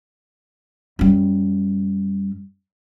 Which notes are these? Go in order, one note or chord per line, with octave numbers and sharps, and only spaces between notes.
F#2 G3